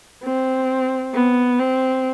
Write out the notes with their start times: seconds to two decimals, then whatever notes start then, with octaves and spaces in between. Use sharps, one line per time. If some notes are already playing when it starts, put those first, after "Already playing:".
0.24 C4
1.14 B3
1.59 C4